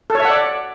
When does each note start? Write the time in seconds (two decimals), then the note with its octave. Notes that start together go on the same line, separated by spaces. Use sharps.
0.10 A4
0.15 C#5
0.20 E5
0.25 F#5
0.30 D5